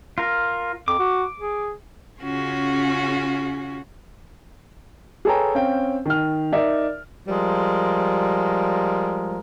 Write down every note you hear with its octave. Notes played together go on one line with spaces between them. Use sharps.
F4 A#4
F2 D6
F#4
G#4
C#3 C#4 F4 F#4 G#4
G#4 A4 B4 C#5 G5 A#5
C4 C#4 F5 G5
D#3 F6
D#4 A#4 D5 E5
F3 G3 G#3 A#4